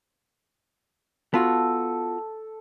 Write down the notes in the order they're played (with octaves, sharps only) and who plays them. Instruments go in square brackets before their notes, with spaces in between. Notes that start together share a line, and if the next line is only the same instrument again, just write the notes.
[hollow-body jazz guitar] B3 F4 F#4 [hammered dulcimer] A4